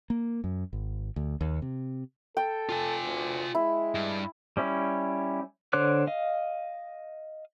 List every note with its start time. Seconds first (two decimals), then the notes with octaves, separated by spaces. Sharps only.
0.10 A#3
0.44 F#2
0.73 G#1
1.16 D2
1.41 D#2
1.62 C3
2.37 A4 G5
2.69 F4 G#5
3.04 D2
3.55 G#3 E4
3.95 G2
4.57 G3 C#4 E4
5.73 D3 C5 C#5 D6 F#6
6.07 D#5 F5